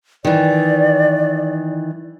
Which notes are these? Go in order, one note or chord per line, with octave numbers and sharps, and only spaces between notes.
D#3 E3 D5